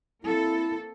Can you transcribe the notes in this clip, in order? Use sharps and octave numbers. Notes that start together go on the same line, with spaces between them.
A#3 C4 E4 A4